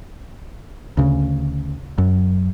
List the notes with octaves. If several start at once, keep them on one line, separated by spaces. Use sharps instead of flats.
D2 C#3
F#2